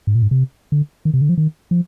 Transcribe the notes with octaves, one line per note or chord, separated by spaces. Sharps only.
G#2
A#2
G#2
C3
D3
D#3
C3
D3
F3
D#3
F3